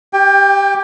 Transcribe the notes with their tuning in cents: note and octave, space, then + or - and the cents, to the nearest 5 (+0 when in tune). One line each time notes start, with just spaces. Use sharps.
G4 +0 G5 +30